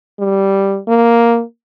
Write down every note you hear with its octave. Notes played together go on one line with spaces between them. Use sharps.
G3
A#3